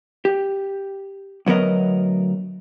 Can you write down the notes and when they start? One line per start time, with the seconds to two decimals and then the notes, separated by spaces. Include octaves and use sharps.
0.25 G4
1.46 D2 F#3 B3 A#4 D#5